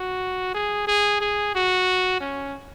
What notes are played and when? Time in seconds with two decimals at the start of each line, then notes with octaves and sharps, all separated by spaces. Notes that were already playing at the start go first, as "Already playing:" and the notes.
Already playing: F#4
0.54 G#4
0.87 G#4
1.21 G#4
1.55 F#4
2.20 C#4